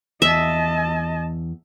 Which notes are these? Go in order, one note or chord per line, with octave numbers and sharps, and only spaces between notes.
E2 D#5 E5 A5